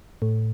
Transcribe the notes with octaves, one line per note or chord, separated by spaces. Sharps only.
A2